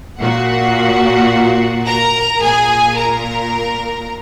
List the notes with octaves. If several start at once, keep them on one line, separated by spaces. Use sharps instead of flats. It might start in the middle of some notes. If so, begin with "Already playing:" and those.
A#2 F#4 F#5
A#4 A#5
A#2 G#4 G#5
A#4 A#5